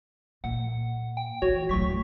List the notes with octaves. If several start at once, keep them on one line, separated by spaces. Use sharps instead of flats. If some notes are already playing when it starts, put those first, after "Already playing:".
A#2 F#5
G5
E3 F#4 C#5
D1 F#3 C#6 B6